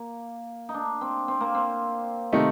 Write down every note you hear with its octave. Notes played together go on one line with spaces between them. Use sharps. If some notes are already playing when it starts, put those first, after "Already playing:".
Already playing: A#3
D#4
D4
C4
C4
A#3
C4
C3 D#3 A3 D#4